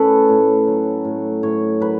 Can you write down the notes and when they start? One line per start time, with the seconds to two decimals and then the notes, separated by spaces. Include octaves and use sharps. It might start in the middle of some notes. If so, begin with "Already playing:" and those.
Already playing: A2 C#4 A4 B4
0.29 A2
0.68 F#3
1.05 A2
1.43 A2 C#5
1.80 F#3 B4